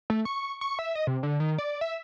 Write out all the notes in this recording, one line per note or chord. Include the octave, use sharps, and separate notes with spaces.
A3
C#6
C#6
E5
D#5
C3
D3
D#3
D5
E5